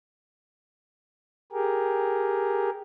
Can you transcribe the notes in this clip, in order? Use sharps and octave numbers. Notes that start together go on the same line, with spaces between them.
G4 G#4 A#4